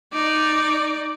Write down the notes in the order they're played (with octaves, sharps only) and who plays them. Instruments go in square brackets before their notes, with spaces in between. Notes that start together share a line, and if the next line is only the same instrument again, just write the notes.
[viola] D#4 D5